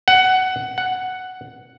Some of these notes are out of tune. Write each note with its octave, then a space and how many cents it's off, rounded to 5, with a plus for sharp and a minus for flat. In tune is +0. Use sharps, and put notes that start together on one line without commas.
F#5 +15
F#5 +5